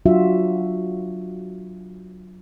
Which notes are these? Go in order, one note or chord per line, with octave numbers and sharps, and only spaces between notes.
F#3 D4 F4 F#4 E5